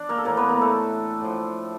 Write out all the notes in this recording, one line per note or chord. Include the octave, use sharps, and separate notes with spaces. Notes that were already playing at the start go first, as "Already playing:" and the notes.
Already playing: D4 D5
A#3 A#4
A4
A2 E3 A#3 A#4
B3 B4
A#3 A#4
A3 A4
A2 F3